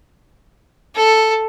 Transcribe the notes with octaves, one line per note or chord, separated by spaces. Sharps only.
A4